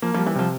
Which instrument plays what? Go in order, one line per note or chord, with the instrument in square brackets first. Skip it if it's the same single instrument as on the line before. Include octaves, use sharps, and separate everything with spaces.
[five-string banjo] F3 [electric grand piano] A#3
[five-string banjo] F3
[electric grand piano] G3
[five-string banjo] E3
[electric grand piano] C3 [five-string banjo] F3